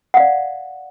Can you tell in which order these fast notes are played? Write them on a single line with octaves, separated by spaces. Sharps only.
F#5 F5 D5